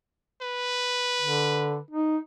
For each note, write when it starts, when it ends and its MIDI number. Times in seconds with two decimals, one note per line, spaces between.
0.42 1.84 71
1.21 1.77 50
1.91 2.17 63